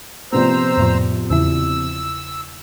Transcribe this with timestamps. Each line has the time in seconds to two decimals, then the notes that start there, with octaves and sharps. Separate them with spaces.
0.32 A#1 C3 B3 C5 A#5 E6
0.77 F2 A2 F3
1.30 E2 C#3 E4 E6